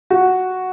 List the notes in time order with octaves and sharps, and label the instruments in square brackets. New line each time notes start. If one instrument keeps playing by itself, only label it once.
[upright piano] F#4